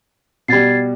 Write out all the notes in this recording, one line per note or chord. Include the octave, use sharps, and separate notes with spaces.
B2 G3 G#6 A6 C7